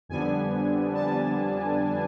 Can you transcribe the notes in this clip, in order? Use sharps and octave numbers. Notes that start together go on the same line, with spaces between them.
F2 D3 G3 B3 D4 G#5
A5